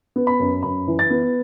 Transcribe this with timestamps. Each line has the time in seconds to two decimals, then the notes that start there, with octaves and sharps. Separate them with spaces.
0.16 B3
0.27 B5
0.40 F#2
0.63 F#2 B5
0.88 E3
0.99 A6
1.10 B3